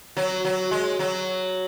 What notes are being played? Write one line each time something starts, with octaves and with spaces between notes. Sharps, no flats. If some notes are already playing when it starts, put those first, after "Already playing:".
F#3
F#3
G#3
F#3